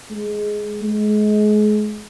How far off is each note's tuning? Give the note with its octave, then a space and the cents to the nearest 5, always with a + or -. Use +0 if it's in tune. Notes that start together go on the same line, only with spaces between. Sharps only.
G#3 +5
G#3 +30